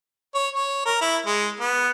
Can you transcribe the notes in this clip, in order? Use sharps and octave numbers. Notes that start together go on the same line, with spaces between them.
C#5
C#5
A#4
E4
G#3
B3